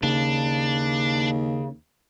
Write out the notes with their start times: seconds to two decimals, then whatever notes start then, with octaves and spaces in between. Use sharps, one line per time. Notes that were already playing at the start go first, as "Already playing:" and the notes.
0.03 D#2 C#3 D4